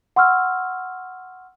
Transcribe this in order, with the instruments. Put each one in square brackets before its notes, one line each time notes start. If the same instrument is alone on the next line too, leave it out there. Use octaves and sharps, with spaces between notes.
[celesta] F#5 C6 C#6 E6 F6